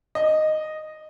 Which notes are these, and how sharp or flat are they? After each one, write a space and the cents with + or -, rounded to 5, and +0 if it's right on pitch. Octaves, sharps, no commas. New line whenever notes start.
D#5 -5